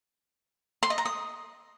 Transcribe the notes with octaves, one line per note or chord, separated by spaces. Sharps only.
C6
D#5
A#5
D#6